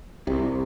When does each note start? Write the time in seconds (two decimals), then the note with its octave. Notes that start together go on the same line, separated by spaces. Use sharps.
0.27 C2 C3